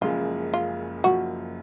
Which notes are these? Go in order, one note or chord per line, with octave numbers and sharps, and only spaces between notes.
F#1 F#2 C#3 F3 G#3 F4
F4
F#1 F#2 F3 F#4